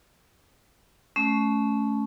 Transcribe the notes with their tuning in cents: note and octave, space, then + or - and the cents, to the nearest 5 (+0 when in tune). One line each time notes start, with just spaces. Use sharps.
A3 -25 C#4 +5